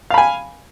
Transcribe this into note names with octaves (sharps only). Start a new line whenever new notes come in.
F5 G#5 B5